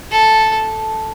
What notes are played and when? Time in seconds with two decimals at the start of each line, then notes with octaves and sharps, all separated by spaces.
0.11 A4